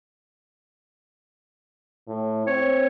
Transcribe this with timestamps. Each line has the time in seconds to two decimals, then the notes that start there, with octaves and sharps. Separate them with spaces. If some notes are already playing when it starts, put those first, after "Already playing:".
2.08 A2
2.47 C4 C#5